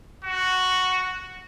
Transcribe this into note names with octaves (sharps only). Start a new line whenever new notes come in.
F#4